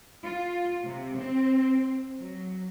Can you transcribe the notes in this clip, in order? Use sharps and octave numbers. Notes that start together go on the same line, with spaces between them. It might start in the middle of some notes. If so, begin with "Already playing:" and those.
F4
C3
C4
F#3